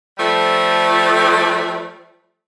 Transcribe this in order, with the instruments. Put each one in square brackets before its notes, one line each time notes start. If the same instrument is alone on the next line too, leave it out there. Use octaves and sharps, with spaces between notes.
[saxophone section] F3 G3 A3 A4